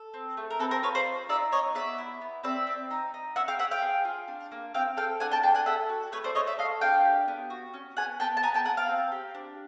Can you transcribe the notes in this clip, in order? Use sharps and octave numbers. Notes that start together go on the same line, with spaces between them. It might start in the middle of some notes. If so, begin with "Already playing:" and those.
Already playing: A4
C4
A3
A#4
C4 A4 B4
A#4 C5
F4 B4 C#5
C5 D5
D#4
D#4 D5 E5
B3 C#5 D#5
B3 D5 E5
E4
B3
C4 D5 E5
C4
D#4
D#4
C#4 E5 F#5
F5 G5
C#4 E5 F#5
F5 G5
G#4
F4
D4
A#3
C4 F5 G5
A4 F5 G5
D4 F#5 G#5
G5 A5
D4 G5 A5
F#5 G#5
A4 E5 F#5
F#4
A3 B4 C#5
C5 D5
A3 C#5 D#5
D5 E5
A4 D#5 F5
D4 F5 G5
G4
B3
F#4
C#4
B3 F#5 G#5
B3 G5 A5
A5
B3 G#5 A#5
G5 A5
B3 F#5 G#5
F5 G5
C4
G4
D4